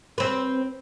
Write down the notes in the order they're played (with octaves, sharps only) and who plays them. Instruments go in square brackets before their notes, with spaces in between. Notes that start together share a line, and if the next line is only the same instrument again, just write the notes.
[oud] C4 B4